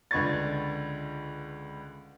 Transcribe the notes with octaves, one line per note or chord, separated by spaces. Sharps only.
C#2 D3 B4 C#6 G#6 A6